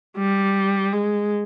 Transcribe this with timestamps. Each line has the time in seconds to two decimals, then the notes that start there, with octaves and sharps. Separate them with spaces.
0.17 G3
0.93 G#3